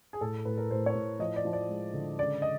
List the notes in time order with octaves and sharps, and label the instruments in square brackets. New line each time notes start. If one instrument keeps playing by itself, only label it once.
[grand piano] G#4
A2 A4
A2 B4
A#4
A2 C5
C#5
A2
F3 D#5
D5
F3
D5
G#3
D3
C#3 D5
D#5